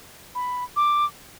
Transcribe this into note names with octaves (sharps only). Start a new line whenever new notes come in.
B5
D6